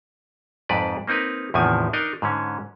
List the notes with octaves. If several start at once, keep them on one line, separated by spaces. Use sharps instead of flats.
F2 G#2 B4 D5
A#3 C4 D#4 A#4 B4
E2 A2 C3 D#3 F3 G#5
D4 D#4 A#4 D#5
G#2 D3 C#4